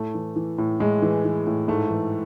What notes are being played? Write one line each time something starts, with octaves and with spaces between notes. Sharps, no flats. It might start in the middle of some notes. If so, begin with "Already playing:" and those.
Already playing: A2 A3
E3
E3
A2
A2 G#3
E3
E3
A2
G#2 A3
E3